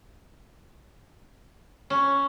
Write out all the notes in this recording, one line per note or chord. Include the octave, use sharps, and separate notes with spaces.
C#4